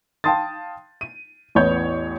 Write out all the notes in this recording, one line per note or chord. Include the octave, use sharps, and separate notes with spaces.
F5 G5 A5 C6 D#6 A6
D#7
A1 E2 B3 C#5 G6